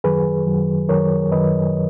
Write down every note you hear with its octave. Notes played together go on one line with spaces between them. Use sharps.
F#2 D#3 F#3 G#4 B4
F#2 D#3 F#3
F#2 D#3 F#3 A#4 C#5
F#2 D#3 F#3 B4 D#5